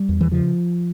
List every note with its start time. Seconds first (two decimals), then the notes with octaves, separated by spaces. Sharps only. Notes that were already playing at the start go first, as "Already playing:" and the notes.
Already playing: G3
0.09 E2
0.21 E3
0.31 C#3 F3